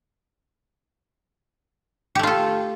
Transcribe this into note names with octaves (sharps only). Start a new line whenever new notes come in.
A3 F4 G4 A4